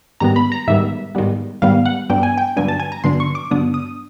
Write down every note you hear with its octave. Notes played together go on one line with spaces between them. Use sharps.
G#2 D#3 G3 B3 A#5
B5
A#5
G#2 D#3 G3 B3 E5
G#2 D#3 G3 B3
G#2 D#3 G3 B3 F5
F#5
G2 D3 F#3 B3 D4 G5
G#5
G5
G2 D3 F#3 B3 D4 G#5
A5
G#5
A#5
G2 D3 F#3 B3 D4 C6
C#6
D6
G2 D3 F#3 B3 D4 D#6
D#6